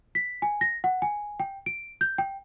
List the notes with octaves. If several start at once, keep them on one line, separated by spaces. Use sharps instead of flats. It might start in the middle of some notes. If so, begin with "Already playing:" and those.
B6
G#5
A#6
F#5
G#5
G5
D7
G6
G5